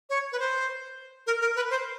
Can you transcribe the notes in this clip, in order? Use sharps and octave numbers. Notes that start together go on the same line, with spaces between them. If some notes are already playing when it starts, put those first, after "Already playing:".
C#5
B4
C5
A#4
A#4
B4
C5